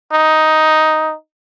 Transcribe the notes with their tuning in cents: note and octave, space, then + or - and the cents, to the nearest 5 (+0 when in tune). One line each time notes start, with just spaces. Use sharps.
D#4 +5